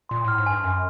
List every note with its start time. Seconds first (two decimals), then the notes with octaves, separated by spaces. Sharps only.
0.09 A#2 C6
0.25 A2 F6
0.38 G#2
0.46 G2 G#5
0.64 F#2 G#5